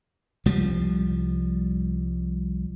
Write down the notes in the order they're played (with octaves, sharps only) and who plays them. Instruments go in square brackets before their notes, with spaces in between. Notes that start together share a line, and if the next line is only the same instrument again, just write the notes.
[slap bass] C2 F3 G3